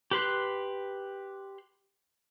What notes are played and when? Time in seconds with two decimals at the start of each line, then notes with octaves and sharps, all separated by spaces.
0.11 G4 B4 C6 F#6